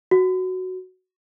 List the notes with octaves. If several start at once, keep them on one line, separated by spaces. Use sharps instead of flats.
F#4